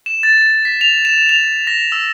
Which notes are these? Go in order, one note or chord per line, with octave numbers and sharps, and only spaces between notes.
E7
A6
B6
F7
E7
F7
A#6
E6